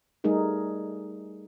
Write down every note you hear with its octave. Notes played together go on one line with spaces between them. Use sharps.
G3 A3 D#4 G#4 A#4